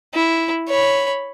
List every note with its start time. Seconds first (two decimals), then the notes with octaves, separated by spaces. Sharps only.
0.14 E4
0.68 C#5 B5